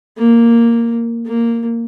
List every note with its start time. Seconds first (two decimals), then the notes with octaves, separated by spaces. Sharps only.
0.18 A#3
1.26 A#3